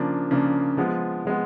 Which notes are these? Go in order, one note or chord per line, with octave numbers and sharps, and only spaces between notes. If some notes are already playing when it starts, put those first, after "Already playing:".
Already playing: C#3 F3 A#3 D4
C#3 F3 A#3 D4
F3 G#3 B3
F3 G#3 B3